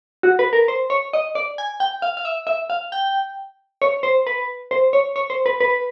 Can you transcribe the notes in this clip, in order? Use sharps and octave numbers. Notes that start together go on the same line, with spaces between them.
F#4
B4
A#4
C5
C#5
D#5
D5
G#5
G5
F5
F5
E5
E5
F5
G5
C#5
C5
B4
C5
C#5
C#5
C5
B4
B4